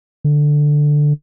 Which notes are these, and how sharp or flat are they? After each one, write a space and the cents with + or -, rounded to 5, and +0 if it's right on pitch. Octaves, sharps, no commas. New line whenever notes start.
D3 +5